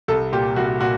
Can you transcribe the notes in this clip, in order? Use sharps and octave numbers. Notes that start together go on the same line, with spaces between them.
C2 A4
A#2 G4
C2 F#4
A#2 F#4